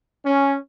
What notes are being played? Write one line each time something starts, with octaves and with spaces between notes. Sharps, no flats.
C#4